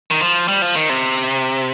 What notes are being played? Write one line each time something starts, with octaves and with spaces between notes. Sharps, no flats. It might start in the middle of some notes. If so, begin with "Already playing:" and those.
D#3
F3
G3
F3
D#3
C3